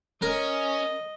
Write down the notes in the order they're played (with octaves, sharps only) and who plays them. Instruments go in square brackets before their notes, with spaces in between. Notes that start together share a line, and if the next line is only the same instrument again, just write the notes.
[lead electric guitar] C#4 [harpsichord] A#4 [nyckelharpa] D#5